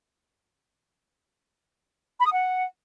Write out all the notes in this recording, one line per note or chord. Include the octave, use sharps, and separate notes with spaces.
B5
D#6
F#5